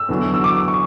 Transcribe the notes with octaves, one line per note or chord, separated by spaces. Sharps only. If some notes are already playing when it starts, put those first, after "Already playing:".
Already playing: E6
E2 D3 F#3
E6
D6
C#6